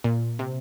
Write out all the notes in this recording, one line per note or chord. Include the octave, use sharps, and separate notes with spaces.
A#2
C3